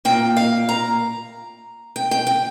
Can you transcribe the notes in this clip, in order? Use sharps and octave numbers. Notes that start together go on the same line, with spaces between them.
A#2 A#3 G5
F5
A#5
G5
G5
G5